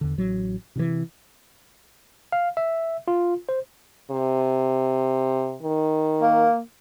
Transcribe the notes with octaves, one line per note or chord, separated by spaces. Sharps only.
E2 D3
A1 F#3
C3 D#3 E3
F5
E5
F4
C5
C3
D#3
A#3